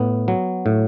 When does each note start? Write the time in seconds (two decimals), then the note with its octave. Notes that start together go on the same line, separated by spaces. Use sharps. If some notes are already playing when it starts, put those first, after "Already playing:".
Already playing: A2 B3
0.28 F#3
0.66 A2